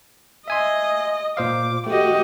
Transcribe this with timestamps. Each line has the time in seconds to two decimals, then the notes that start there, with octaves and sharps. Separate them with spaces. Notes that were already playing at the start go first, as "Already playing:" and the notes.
0.48 D#5 E5 G#5 C6
1.37 A#2 C5 F5 D6
1.86 A3 F#4 G4 D#5